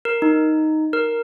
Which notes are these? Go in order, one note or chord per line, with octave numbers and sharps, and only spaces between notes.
A#4
D#4
A#4